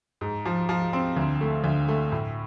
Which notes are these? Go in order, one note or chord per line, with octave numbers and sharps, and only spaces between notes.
G#2
F3
F3
C4
D2
A3
D2
A3
A2